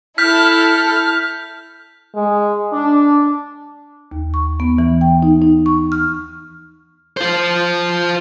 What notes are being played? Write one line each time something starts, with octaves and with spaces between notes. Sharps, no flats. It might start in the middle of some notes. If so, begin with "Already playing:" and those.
E4 A4 F6 G6 B6
G#3
D4
D#2
C#6
B3
E3
G5
D#4
D#4
C#6
F6
F4 C5